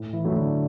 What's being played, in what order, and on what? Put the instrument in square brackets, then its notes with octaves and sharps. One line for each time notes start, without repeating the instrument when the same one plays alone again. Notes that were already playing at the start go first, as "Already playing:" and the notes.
Already playing: [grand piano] A2
[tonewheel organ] E3
[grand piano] F#3 A3 E4 A4
[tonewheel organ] D3